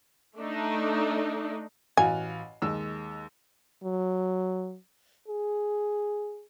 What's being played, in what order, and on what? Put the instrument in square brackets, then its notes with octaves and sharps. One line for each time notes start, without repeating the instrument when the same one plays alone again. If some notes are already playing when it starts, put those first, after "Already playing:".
[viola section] A3 D4 D#4
[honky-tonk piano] A1 F#4 F5 [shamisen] G#5
[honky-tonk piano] D#2 G#3 E6
[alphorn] F#3
G#4